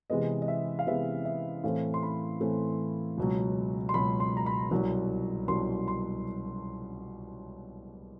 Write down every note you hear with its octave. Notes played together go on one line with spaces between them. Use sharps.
C3 E3 G#3 B3 D#5
D#5
E5
F5
C3 E3 G#3 B3 E5
E5
A2 E3 A3 C4 F5
C6
B5
A2 E3 A3 C4
C#2 B2 F#3
C6
C#2 B2 F#3 B5
C6
A#5
B5
C2 B2 F#3
C2 B2 F#3 C6
C6